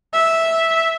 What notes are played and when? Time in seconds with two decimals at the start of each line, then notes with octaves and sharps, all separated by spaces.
0.13 E5